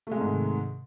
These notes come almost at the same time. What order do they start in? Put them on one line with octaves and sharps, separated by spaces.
A3 G#3 C3 G#2 D#3